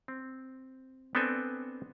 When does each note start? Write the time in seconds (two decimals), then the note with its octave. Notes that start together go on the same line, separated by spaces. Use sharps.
0.08 C4
1.15 B3 C4 D4 A4 G5 G#5